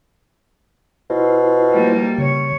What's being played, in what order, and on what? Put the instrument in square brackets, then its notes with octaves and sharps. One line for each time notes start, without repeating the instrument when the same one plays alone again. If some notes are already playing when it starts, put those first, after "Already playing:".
[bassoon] B2 [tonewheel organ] E4 F4 C5
[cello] G3 A#3
[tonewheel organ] C#3 [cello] C#5